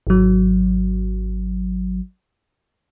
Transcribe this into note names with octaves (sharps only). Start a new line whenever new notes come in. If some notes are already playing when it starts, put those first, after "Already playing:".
G#1 F#3